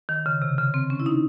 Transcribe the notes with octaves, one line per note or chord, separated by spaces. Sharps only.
D#3
C#3
C3
C#3
C4
C#4
E4
D#4